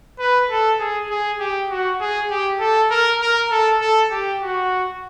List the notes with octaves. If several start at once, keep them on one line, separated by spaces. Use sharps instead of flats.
B4
A4
G#4
G#4
G4
F#4
G#4
G4
A4
A#4
A#4
A4
A4
G4
F#4